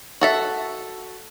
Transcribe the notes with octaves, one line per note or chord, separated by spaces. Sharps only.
F#4 A4 E5